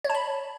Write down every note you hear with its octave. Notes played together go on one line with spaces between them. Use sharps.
C#5
A5
B5